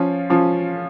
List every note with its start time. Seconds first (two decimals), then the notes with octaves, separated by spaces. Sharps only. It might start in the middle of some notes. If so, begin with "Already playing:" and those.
Already playing: F3 C#4 F4
0.30 F3 C#4 F4